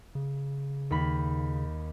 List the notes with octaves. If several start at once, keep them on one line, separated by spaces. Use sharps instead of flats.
C#3
D#2 B5